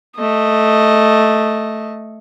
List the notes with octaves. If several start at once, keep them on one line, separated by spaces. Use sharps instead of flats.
A3 D#5